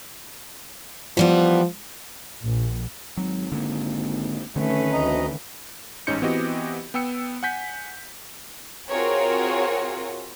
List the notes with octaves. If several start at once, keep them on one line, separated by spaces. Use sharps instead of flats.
E3 F3 G3 B3
A#1
G#1 F#3
D3 A#3
F1 D3 D#3 A3 C#4 B4
D2 D#5 A#5
A1 G#2 C#4 D#4 G6 C#7
E3 B3 C4 F#4 G4 D#5
B3 G5 E6 C#7
F#5 G#5 G6 B6
C4 F4 F#4 G#4 A#4 C#5